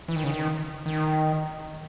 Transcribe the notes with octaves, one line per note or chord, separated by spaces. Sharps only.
E3
D#3
C#3
D#3
D#3